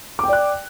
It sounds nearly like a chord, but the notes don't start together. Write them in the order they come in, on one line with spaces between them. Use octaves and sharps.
D6 G5 D5 F#6